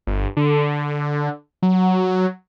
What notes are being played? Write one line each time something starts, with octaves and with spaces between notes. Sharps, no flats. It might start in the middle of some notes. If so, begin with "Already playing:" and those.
G1
D3
F#3